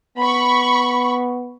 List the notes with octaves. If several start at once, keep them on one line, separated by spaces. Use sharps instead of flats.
B3 B5 C#6